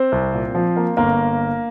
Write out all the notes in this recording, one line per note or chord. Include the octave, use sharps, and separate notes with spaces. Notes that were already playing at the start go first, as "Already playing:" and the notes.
Already playing: C4 C5
C2
A#2
F3
A#3
G1 A#3 A#4